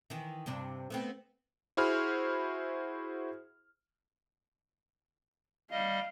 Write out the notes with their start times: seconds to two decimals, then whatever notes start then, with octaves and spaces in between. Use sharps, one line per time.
0.10 D#3 E3
0.46 G2 C3 D4
0.90 A3 B3 C4
1.77 E4 F#4 G#4 C5 B5 F6
5.71 G3 D#5 F5